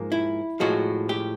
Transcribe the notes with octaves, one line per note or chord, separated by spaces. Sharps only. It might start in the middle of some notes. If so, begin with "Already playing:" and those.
Already playing: G#2 F3 A#3
E4
A2 F3 G#3 F#4
G4